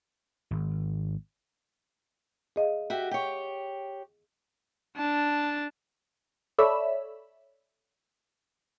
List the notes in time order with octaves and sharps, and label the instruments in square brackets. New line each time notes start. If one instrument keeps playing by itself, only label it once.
[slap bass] G#1
[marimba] G#4 D#5 F5
[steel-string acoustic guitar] F#4 G4 E5
G4 C#5
[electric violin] D4 A5
[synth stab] A4 C#5 D5 E5 B5 E6